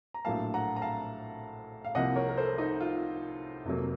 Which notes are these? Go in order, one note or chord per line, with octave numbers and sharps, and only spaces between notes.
A#5
A#1 A2 F#3 A#3 F5 A5
F#5 A#5
A#5
F5 A5
F5
C2 C3 F3 A#3 D#5 F#5
A#4 C#5
A#4
A4 C5
D#4
F4
F1 F2 C3 F#3 A#3